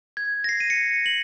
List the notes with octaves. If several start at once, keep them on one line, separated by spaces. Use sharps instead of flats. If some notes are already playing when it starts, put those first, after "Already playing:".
G#6
A#6
C7
D#7
C#7
F#7